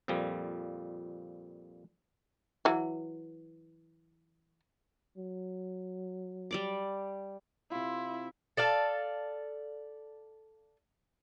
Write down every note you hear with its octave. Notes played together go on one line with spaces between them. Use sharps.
F2 A#2 F3 G3
E3 F#3
F#3
G3 D5 D6
C3 E4 F4
A4 D5 F5 A5